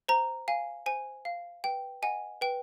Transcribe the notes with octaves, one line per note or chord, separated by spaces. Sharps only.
C5 A#5
F5 G#5
C5 G#5
F5
B4 G5
D#5 F#5 G#5
B4 G5